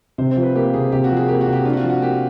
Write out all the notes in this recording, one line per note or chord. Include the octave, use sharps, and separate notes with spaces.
C3 C5
C5
F3
B4
A#3 G4
C3 G#4
C3 G4
F#4
F3
G#4
A#3 G4
F#4
C3
G4
D4 F4
F#4
F4
F3
F#4
A#3 G4